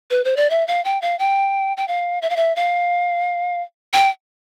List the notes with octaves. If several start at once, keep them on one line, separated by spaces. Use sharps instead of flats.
B4
C5
D5
E5
F5
G5
F5
G5
G5
F5
E5
F5
E5
F5
G5